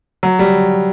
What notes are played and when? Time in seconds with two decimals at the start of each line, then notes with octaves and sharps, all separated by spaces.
0.23 F#3
0.39 G3